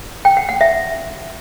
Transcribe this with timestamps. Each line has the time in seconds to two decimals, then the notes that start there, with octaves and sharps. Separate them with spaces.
0.25 G5
0.37 F#5
0.49 F#5
0.61 E5